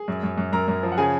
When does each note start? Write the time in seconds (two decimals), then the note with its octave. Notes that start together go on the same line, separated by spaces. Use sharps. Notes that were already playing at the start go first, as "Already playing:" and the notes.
Already playing: G#4
0.08 F#2
0.23 F#2
0.38 F#2
0.53 F#2 A#4 A#5
0.68 F#2
0.83 F3
0.92 F#5
0.97 C#3 G#4 G#5